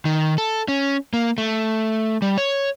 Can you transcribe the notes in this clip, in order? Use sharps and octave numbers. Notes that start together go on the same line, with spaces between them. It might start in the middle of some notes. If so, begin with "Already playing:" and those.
D#3
A4
C#4
A#3
A3
G3
C#5